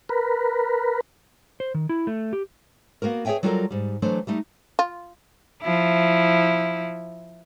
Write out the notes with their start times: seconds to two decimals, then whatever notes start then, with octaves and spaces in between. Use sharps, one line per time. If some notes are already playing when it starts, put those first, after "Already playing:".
0.09 A#4 B4
1.60 C5
1.74 D#3
1.89 E4
2.07 A3
2.33 G4
3.02 A#3 B3 F#4 A#4
3.25 G#4 C#5 D5 E5 G5 G#5
3.43 F#3 G3 F4 F#4 A4 A#4
3.71 G#2 G3
4.02 E3 F#3 A3 D4 C5
4.27 G3 A3 D#4
4.79 F4
5.62 F3 E4